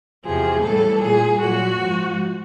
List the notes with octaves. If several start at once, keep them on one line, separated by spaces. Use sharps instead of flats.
E2 C3 F3 G#4
A2 E3 G3 A4
A#2 G3 G#4
A#2 F#3 F#4
G#2 F3